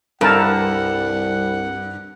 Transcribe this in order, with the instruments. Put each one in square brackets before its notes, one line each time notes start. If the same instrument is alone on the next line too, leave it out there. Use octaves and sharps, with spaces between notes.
[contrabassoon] C2 [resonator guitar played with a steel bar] G2 [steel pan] A4 A#4 A5 [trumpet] F#5